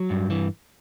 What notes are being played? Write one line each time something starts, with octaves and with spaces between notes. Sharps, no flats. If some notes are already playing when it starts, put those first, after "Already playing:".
Already playing: F#3
G2
E3